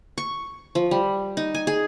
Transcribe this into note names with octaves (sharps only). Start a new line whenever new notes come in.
C#6
F3
G3
D#4
G#5
G#4